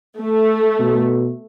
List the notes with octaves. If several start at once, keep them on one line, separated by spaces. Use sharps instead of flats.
A3
B2